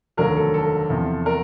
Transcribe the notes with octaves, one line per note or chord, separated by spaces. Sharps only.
F1 D#2 D3 F#3 A#4
A4
A4
E2 C3 F3
A#4